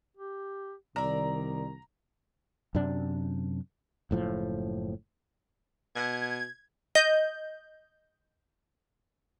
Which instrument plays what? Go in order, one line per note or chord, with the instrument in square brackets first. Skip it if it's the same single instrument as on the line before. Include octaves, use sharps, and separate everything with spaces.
[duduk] G4
[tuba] C2 [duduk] D#3 [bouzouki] D5 E5 [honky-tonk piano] A#5
[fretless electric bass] F#2 C3 D4
F#1 A2 F3
[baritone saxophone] B2 [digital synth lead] G#6
[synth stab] D#5 G6